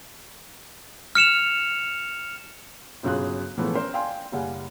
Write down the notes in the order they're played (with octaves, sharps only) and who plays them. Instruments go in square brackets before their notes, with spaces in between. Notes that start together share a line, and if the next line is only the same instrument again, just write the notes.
[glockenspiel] F6 C#7 E7 F7
[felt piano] G1 C#3 F#3 F4 G#4 F#6
A2 E3 F3 G#3 A3 B3
C#4 A#4 C5
D5 F5 G5 G#5 C6
F#1 G3 F5 F#5 G#5